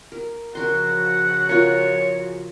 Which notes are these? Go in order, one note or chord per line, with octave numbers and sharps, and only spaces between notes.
A#4
C#3 F3 F#4 A#4 F#5 C6
F4 A#4 C#5